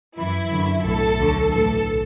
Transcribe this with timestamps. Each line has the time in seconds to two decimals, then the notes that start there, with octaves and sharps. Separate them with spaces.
0.17 F#2 E3 E4
0.51 F#2 D3 F#3
0.84 B1 A2 F#3 A4
1.18 D2 D3 F#3
1.52 B1 A2 E3 A4